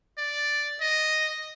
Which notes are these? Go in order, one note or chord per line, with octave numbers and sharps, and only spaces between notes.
D5
D#5